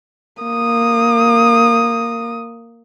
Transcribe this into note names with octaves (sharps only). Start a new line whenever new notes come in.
A#3 D#6